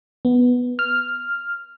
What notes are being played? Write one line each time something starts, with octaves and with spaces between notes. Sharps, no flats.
B3
F6